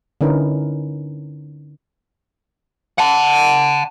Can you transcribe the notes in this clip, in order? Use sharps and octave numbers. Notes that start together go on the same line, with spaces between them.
D3 C#4 D#4 E4 A#4 B4
F#5 A5